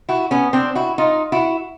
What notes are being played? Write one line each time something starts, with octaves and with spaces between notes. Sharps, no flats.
E4 F#4
B3 C#4
C4 D4
E4 F#4
D#4 F4
E4 F#4